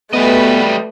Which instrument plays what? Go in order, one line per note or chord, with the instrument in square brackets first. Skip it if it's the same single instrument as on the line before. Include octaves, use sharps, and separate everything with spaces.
[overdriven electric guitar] G3 D#5 [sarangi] A3 [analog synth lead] B3 [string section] F#4 B4